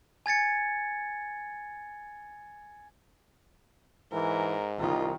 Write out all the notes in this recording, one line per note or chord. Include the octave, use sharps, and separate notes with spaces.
G#5 G#6 A6 C#7
G#2 E3 A#4
C2 D#3 F4